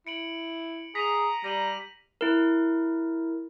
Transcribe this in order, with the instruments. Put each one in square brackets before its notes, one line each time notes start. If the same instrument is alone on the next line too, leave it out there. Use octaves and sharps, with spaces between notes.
[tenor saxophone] E4 [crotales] C#7 D7 F#7
[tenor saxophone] G#4 [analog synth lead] A#5 [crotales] B6 D#7 F7
[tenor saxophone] G3 [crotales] A#6 D#7 F#7
[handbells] E4 A#4